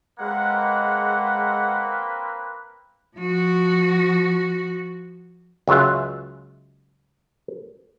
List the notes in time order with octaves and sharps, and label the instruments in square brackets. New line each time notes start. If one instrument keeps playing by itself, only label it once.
[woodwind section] G#3 F#5 [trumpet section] A#3 C4 B4
[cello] F3 F#4
[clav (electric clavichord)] C#2 F#3 G#3 F4 E5